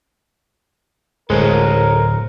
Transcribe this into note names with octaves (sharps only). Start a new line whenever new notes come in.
D1 G#3 A4 A#4 C5 C#5